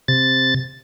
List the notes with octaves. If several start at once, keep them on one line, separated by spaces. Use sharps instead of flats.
C3 A6